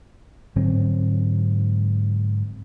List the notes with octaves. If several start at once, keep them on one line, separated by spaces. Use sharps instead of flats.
G#2 D3 F#3 C4